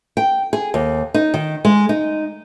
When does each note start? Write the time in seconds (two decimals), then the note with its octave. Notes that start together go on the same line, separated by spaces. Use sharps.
0.17 G5
0.53 G#4
0.74 D#2
1.14 D#4
1.34 D#3
1.65 G#3
1.89 D#4